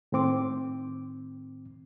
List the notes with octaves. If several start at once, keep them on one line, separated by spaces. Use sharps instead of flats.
A2 D#3 C4 D6